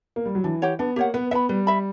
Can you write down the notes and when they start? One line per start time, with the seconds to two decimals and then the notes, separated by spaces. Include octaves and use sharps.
0.16 A#3
0.25 G3
0.35 F#3
0.44 E3 D4
0.62 G4 C#5 F#5
0.79 B3 D4
0.96 A#3 G4 C#5 F#5
1.14 B3 B4
1.31 B3 E5 B5
1.49 G3 B4
1.67 E5 B5